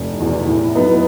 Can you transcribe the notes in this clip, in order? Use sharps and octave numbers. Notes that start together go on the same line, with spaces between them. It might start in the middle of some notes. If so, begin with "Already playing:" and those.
Already playing: F1
E2 B2
A2
F#3 B3 D#4